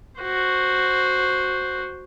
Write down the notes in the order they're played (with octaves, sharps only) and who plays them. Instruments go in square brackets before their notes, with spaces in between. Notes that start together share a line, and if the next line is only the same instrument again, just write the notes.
[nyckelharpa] F#4 C5